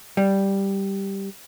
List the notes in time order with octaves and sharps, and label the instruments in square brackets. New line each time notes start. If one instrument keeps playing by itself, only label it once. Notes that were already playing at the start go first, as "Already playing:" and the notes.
[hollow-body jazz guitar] G3